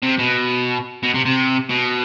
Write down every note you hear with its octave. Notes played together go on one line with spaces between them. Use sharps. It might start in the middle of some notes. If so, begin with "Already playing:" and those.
C3
B2
B2
C3
C3
B2